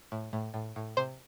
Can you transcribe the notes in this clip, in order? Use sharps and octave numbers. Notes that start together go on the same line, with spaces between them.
A2
A2
A2
A2
C3 C5